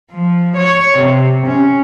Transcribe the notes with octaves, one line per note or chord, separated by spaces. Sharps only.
F3
C#5
C3
C#4